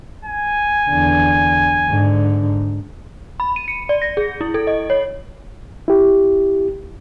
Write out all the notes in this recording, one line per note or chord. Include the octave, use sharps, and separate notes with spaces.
G#5
E2 D3
G#2 D3
B5
D#7
C#7
D5
A#6
G#4
E4
A4
D#5
C#5
E4 G4